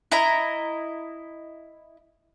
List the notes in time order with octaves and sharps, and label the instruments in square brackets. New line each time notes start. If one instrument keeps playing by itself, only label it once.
[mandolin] E4 D#5 A#5